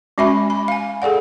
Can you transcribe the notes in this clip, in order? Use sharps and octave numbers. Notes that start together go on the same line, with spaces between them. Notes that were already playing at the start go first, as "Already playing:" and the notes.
G#3 C#4 F#4 E5 G#5 B5
B5
F5 G#5
G#4 A4 D5 F#5